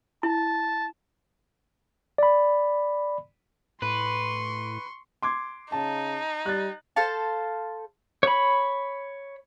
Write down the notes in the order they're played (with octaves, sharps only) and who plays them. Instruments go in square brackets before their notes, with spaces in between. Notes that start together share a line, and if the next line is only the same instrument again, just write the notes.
[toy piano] E4 [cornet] A5
[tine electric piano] D5 B5
[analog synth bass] A2 [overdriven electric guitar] B4 [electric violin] C6 C#6
[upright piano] C6 D6 G#6
[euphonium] C#3 [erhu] D#4 [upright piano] A5
[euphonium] G3 [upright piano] F#6 A6
[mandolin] A4 C5 F5 A5
[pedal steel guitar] C#5 B5